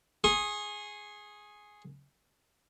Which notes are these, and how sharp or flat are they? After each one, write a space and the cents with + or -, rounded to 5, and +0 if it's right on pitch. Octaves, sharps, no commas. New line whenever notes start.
G#4 +0 C#6 -40